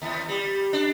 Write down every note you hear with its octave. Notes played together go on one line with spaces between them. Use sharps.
D#2
G3
D4